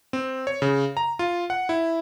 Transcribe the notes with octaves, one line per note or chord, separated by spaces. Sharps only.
C4
C#5
C#3
A#5
F4
F#5
E4